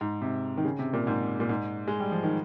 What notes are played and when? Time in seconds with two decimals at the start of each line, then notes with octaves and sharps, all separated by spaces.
0.01 G#2
0.21 C3
0.57 D#3
0.65 C#3
0.79 C3
0.93 A#2
1.07 G#2
1.40 A#2
1.49 G#2
1.88 G#3
2.00 G3
2.12 F3
2.24 D#3